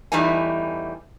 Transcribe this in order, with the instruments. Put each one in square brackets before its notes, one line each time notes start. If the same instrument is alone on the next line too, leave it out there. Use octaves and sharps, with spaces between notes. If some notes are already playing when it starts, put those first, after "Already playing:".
[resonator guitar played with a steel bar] E2 E3 G3 A3 D#4 G#5